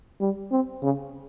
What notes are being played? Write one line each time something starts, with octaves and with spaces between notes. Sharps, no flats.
G3
C4
C#3